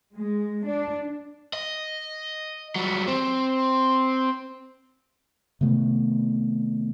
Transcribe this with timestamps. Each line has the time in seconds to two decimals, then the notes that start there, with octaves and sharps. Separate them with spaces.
0.15 G#3
0.66 D4
1.53 D#5
2.76 F#3 G3
3.07 C4
5.61 C3 D#3 A3 B3